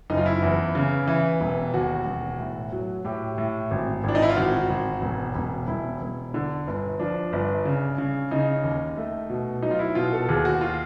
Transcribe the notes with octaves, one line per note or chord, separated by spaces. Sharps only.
F#1 D#4
F4
E4
E2
C#3
E3
E1
D#2 F#4
E1
A2
F#3
A2 G4
A2
G#1
G#1 D4
D#4
E4
F4
G#1 F#4
G#1
E1
E1
E1 E4
E1
D3
G1
F3 D4
G1
C#3
C#3
C#3 D#4
D#2
A3
B2
F#3 D#4
F4
E4
B2 F4
A4
D#2 G#4
F#4
F4